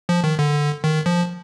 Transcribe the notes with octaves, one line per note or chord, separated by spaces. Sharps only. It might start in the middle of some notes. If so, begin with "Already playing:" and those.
F3
D#3
D3
D#3
F3